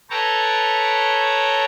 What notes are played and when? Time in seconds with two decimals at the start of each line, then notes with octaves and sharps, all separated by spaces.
0.10 A4 B4 C#5 G5 A5 A#5